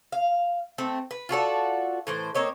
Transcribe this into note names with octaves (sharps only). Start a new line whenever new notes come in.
F5
A3 C4
B4
F4 F#4 A4 D5
A2 E3 C5
A#3 C4 C#5 D#5